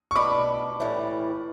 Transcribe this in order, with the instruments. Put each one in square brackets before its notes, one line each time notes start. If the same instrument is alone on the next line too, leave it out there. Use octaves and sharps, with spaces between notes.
[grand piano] C#6
[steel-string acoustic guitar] B2 G3 D4 [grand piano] B5 D6
[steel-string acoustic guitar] A2 E3 G3